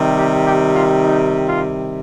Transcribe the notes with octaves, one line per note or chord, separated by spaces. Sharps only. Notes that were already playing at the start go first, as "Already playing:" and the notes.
Already playing: C3 D#3 G3
G4
G4
F4
D#4
F4